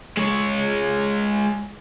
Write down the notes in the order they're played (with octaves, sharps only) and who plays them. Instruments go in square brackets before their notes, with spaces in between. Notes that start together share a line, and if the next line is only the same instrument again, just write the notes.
[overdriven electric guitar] G#3 C#5